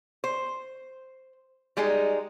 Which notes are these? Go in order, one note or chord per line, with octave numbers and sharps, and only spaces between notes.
C5
G3 G#3 D#4 G#4